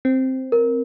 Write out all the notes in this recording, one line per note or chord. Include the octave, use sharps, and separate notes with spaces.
C4
A#4